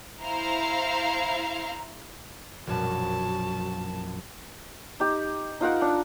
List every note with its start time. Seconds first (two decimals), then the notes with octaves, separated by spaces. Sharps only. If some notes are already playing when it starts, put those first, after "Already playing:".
0.21 E4 C5 F5 A#5
2.67 A#1 F#2 B2 F#4 A5
5.00 D#4 G4
5.61 D#4 F4 A#4 F#5
5.81 D4